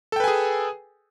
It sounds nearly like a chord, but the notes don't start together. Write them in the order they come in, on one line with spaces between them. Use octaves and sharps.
A4 G5 B4 G#5 G#4